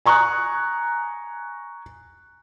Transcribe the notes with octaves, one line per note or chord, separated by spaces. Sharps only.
G#5 A#5 C#6 D#6 F#6